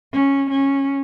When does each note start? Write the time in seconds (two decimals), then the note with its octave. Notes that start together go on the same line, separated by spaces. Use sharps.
0.13 C#4
0.51 C#4